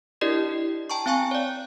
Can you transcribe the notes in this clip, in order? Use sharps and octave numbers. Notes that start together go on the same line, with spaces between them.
D4 E4 G4 A#4 D5 D#5
G5 A5 A#5 C#6
C4 F5 G5 G#5 C#6
C#5 D5